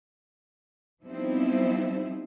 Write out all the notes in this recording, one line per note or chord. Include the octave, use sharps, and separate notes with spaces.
F3 G3 B3 C4 D#4 E4